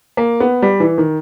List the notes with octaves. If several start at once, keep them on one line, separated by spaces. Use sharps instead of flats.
A#3
B3
G3
E3
D#3